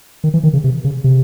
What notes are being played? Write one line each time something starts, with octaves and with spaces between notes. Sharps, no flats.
D#3
E3
D#3
C#3
C3
C#3
C3